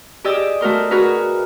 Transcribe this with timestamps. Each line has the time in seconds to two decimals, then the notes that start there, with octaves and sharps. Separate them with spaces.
0.24 G4 G#4 D5 D#5 E6
0.61 A3 F#4 A#4 C5
0.91 F#4 G#4 A#4 B4